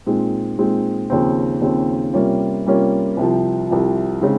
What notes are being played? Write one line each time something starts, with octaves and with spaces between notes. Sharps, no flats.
A#2 G#3 C4 D#4
A#2 G#3 C4 D#4
D#2 C#3 F3 C4
D#2 C#3 F3 C4
C3 G3 A#3 C#4 F4
C3 G3 A#3 C#4 F4
C2 C3 F3
C2 C3 F3
C#3 G#3 C4 D#4